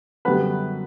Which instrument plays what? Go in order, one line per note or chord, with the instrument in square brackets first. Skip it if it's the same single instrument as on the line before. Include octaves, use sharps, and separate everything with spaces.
[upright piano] F#2 D3 G3 B3 B4